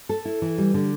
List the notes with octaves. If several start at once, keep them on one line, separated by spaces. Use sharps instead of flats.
A4
E4
E3
G3
D3